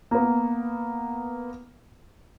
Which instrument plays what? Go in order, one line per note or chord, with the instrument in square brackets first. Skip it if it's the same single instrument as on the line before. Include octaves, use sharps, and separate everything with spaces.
[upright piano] A#3 B3